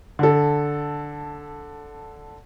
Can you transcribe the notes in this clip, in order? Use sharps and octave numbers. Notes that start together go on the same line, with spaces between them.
D3 A4